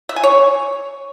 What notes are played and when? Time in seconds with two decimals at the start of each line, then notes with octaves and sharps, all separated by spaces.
0.09 E5
0.16 G#5
0.23 C#5